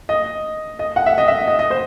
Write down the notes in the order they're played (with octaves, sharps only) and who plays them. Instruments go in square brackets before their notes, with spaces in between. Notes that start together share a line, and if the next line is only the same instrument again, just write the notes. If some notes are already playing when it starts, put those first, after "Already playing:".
[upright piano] D#5
D#5
F#5
E5
D#5
E5
D#5
D#5
C5